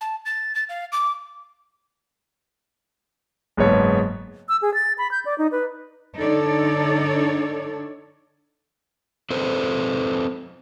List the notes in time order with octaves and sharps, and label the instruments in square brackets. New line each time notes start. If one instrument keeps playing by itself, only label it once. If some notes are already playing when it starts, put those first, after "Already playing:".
[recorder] A5
A6
A6
F5
D6
[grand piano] F#1 G#2 B3 C#5 A5
[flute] E6
G#4
A6
B5
G6
D5
D#4
B4
[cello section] D3 D4 D#4 A4 C#5 D5
[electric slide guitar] C4 A4 B4 C5